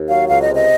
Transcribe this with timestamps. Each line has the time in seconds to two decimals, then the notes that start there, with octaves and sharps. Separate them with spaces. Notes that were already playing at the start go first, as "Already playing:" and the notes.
Already playing: D#2
0.09 F#3 F5
0.29 C#2 F5
0.42 D#5
0.49 C3
0.56 D#5